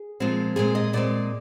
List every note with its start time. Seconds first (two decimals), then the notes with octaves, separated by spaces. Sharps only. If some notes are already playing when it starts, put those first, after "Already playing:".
Already playing: G#4
0.20 A#2 F3 G#3 C4
0.56 A#2 G#3 C4 G#4
0.75 D#5
0.93 A#2 G#3 C4 D5